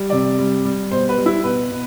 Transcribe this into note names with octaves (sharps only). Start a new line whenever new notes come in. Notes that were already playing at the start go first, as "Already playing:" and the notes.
Already playing: G3
C3 D5
G3
G3
B2 C5
B4
G3
E4
B2 B4
B2